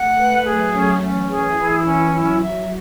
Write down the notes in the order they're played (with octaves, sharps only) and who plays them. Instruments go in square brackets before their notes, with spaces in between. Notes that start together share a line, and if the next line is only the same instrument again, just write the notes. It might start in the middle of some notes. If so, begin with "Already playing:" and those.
Already playing: [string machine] A3 [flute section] F#5
[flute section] B4
[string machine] F#3 [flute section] G#4
[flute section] C#4
[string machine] E3 [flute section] C#4
[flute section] G#4
E4
C#4
[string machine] F#3 [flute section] E4
[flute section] E5